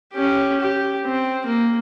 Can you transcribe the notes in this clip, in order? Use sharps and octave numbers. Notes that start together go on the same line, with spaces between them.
C#4 G4
G4
C4
A#3